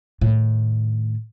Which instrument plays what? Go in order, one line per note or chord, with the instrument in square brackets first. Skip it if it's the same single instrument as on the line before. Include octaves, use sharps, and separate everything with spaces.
[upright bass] A2 D#3